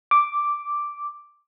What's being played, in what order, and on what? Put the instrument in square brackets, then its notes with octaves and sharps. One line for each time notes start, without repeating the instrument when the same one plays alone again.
[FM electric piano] D6